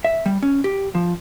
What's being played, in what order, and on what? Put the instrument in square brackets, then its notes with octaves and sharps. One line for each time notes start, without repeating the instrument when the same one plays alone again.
[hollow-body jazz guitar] E5
G3
C#4
G4
F3